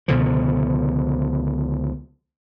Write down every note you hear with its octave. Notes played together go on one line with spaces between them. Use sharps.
C#2 B2 D3 F3